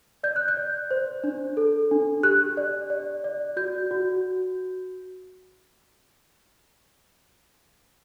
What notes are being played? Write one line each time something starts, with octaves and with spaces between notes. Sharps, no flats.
D5 G6
F#6
G6
D5
C5
D4
A4
D4
G4 F#6
D5
D5
D5
F#4 G6
F#4